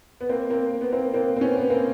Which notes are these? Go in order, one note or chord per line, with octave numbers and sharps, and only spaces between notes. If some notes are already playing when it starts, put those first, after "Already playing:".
B3
A#3 C4
A#3 C4
B3
A#3 C4
A#3 C4
C4
B3 C#4
B3
A#3 C4